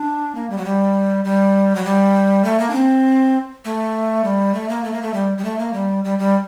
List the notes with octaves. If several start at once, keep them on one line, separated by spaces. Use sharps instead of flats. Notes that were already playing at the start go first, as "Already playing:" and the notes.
Already playing: D4
A#3
G3
F#3
G3
G3
F#3
G3
A3
A#3
D4
C4
A3
G3
A3
A#3
A3
A#3
A3
G3
G3
A3
A#3
G3
G3
G3